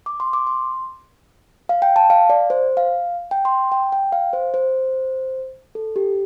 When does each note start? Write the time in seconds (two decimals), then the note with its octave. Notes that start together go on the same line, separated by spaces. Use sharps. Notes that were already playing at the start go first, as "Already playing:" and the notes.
0.06 D6
0.20 C6
0.33 D6
0.47 C6
1.69 F5
1.82 G5
1.96 A5
2.10 F5
2.30 D5
2.50 C5
2.77 F5
3.31 G5
3.45 C6
3.72 G5
3.92 G5
4.12 F5
4.33 C5
4.54 C5
5.75 A4
5.96 G4